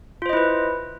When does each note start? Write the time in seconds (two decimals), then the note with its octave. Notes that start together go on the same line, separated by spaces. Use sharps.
0.22 F4
0.26 C5
0.29 D#5
0.33 E4
0.37 B4